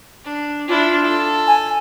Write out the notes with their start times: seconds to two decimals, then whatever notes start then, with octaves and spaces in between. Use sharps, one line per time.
0.25 D4
0.68 D4 E4 F4
1.04 A4
1.47 G#5